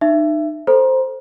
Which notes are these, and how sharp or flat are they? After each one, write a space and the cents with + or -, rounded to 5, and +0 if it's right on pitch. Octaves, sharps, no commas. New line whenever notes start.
D#4 -35 E5 +20
A4 +10 C5 +0 A#5 +30